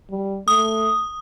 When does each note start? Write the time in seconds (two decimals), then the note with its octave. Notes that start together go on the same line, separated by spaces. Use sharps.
0.10 G3
0.48 A3 D#6